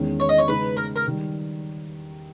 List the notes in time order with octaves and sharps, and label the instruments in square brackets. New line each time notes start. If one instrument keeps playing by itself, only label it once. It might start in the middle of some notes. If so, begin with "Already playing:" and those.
Already playing: [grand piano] E2 D#3 G#3 C#4
[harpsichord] C#5
D#5
C#5
[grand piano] C#3 G#3 D#4 [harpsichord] B4
[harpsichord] A#4
A#4
[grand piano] D#3 G3